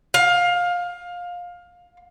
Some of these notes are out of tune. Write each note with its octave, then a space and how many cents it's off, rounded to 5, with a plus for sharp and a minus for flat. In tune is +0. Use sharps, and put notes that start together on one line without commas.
F5 +20